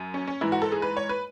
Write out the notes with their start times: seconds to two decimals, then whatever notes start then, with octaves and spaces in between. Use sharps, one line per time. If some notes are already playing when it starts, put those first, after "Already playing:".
Already playing: F#2
0.14 C#4
0.27 C#4
0.41 G#2 E3 E4
0.52 F#4
0.62 A4
0.72 G#4
0.82 B4
0.97 C#5
1.09 B4